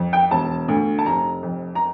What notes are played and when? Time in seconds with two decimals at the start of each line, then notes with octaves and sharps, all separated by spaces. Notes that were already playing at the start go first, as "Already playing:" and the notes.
Already playing: F2
0.13 G5
0.31 E1 A5
0.68 D2
0.99 A5
1.06 F1 A#5
1.43 F2
1.75 A#5